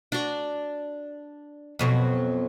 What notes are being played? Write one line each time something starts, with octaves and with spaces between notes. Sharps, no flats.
D4 F#4
F2 B2 F#3